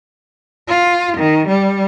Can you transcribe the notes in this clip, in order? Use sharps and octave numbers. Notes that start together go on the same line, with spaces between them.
F4
D#3
G3